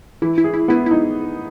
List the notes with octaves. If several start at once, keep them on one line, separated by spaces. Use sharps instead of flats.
E3 E4
E4
G#4
E4
B3 E4
E4
D#4